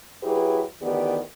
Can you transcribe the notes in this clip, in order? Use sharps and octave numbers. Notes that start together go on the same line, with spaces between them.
F#3 E4 G4 G#4 B4
D2 D#3 E3 B3 G4 D5